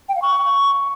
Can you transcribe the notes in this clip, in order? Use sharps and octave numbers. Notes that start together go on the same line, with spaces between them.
G5
F5
C#6